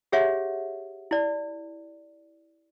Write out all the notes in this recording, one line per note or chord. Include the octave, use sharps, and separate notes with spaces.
G4 G#4 C#5 E5 F#5
E4 D5